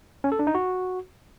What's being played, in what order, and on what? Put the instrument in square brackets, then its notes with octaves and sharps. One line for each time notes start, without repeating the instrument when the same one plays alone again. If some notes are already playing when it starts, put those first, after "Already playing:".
[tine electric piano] C#4
A4
D4
D#4
F#4